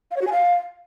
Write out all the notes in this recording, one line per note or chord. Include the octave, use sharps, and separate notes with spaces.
F5
C#5
F#4
G#5
F5